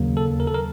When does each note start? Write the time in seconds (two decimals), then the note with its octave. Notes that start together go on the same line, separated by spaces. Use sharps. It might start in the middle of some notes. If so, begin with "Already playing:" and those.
Already playing: D#2 C#3 F#3 A#3
0.17 A4
0.40 A#4
0.47 A4
0.54 A#4